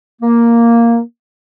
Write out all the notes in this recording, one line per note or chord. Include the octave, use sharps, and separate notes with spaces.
A#3